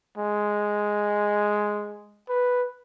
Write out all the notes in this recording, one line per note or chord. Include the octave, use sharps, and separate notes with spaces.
G#3
B4